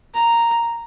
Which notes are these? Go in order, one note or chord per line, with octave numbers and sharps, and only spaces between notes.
A#5